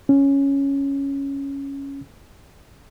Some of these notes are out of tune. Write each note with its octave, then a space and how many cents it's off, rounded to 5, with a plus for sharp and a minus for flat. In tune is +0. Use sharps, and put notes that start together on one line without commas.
C#4 +0